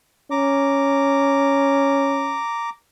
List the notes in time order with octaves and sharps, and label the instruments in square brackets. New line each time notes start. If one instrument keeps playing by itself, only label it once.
[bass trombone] C#4 [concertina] A#5 D6